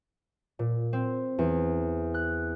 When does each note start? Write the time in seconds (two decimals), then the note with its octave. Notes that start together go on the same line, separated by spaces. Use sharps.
0.59 A#2
0.93 C4
1.39 E2
2.14 F#6